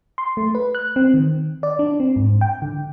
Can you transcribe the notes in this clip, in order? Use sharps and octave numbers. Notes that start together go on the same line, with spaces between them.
C6
A3
B4
F#6
C4
D#3
D5
D4
C4
G#2
G5
D3